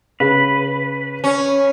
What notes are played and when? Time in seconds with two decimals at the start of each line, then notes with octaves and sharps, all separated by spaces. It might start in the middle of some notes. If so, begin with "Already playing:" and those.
0.20 C#3 B4
1.24 C#4